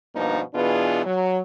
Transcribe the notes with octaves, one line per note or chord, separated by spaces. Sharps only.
G2 B2 F3 A#3 D4 D#4
B2 E3 B3 D4 F4 G#4
F#3